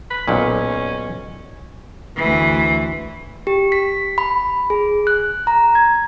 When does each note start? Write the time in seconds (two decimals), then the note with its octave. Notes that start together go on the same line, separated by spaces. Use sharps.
0.11 B5
0.28 B1 A#2 C#4
2.16 D2 E3
3.47 G4
3.72 B6
4.18 B5
4.70 G#4
5.07 F#6
5.47 A#5
5.75 G#6